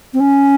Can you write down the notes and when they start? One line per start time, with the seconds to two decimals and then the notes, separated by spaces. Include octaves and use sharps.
0.14 C4
0.20 C#4